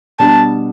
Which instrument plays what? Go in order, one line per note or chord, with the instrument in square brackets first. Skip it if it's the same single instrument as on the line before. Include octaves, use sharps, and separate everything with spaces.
[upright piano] B2 G3 D4 [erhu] A5